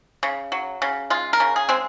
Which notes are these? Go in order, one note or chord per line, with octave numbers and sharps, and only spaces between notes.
C#3
F#3
C#3
G#3 F4
A#4
C#3
G#4
G#3 C4